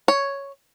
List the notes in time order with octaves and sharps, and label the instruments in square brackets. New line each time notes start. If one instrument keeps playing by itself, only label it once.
[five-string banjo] C#5